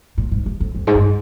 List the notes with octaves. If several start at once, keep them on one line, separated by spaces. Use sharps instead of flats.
A#2
G#2
G2
F2
F2
G#2
G2